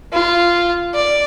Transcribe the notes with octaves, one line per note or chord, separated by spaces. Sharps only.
F4
D5